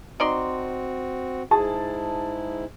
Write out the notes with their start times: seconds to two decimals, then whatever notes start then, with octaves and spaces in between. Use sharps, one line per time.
0.20 C4 D#4 F#4 D5 C6
1.51 G#2 E4 G#4 A5